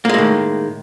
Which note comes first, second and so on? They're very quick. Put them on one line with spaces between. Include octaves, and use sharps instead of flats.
A#3 G#3 A2 D#3